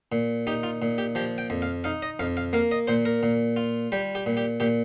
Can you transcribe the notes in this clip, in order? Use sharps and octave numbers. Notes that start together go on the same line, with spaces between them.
A#2
D#4 G4
F4
A#2
G4
F3 G4
G5
F2
F5
D#4 F5
D#5
F2 F5
F5
A#3 F5
D#5
A#2 C5
A#4
A#2
F4
G3 G4
G4
A#2
G4
A#2 G4